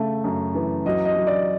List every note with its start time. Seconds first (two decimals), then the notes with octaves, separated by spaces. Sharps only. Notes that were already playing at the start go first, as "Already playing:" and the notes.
Already playing: C#3 A3
0.24 F#2
0.55 E3
0.86 F#3 D#5
1.05 D#5
1.16 F#3
1.27 D5